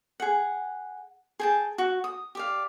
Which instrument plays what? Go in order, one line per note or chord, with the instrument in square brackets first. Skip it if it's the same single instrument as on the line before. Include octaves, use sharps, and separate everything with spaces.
[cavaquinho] G#4 F#5
G#4 G5 A5
F#4
D#6
G4 D5 F5